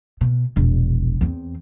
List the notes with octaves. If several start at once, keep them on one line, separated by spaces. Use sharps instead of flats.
B2
E1 A#1
E2 C4